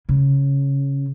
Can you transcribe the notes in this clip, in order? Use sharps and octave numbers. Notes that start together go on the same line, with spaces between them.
C#3